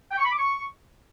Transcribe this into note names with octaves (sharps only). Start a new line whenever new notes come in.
G5
C#6
B5
D6
C#6